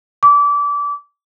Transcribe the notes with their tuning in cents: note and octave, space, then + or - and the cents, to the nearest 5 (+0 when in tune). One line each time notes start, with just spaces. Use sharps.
D6 -25